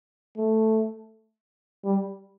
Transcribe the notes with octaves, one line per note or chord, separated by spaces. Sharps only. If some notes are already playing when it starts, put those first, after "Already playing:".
A3
G3